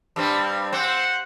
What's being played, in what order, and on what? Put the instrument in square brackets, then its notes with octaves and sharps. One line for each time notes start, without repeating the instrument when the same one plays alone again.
[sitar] G2 G3 C4
[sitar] C4 [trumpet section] C5 F#5